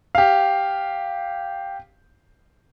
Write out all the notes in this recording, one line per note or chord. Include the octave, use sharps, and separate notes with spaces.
G4 F5